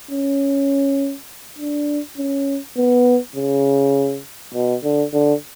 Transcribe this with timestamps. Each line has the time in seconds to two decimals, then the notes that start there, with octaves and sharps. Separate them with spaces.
0.11 C#4
1.59 D4
2.18 C#4
2.77 B3
3.36 C#3
4.54 B2
4.84 D3
5.13 D3